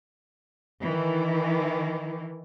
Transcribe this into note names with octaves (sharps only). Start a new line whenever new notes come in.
D#3 E3